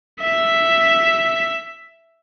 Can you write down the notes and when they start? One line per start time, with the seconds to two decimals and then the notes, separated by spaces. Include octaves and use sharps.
0.21 E5 B6